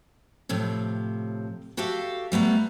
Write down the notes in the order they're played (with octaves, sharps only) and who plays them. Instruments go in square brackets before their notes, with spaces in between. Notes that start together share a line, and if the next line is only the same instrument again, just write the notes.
[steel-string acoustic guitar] A2 C3 F3
F#4 G4 A4 E5 F5
G3 A3 B3 A#5